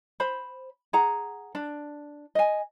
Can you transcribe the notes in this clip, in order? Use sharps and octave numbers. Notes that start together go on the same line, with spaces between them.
C5 B5
G#4 F#5 A#5
D4
D#5 G#5